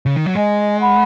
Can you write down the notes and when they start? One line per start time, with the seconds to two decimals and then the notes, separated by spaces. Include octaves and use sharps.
0.06 C#3
0.16 D#3
0.26 F#3
0.35 G#3 D#5 G#5
0.80 F#5 B5